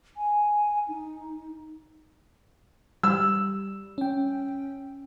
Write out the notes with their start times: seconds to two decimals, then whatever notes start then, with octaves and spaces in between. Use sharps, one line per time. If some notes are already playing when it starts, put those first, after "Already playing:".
0.17 G#5
0.88 D#4
3.03 G3 E6
3.98 C#4 G5